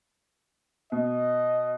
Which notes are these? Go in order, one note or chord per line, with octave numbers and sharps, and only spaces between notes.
B2 D#5